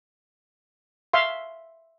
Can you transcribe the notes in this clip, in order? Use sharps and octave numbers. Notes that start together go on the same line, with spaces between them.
E5 F5 C6